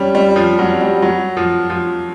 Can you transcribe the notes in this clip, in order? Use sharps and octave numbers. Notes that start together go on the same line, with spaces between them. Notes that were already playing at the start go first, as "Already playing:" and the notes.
Already playing: G3 C#4
G3
F3
F#3
G3
F#3
F3
F3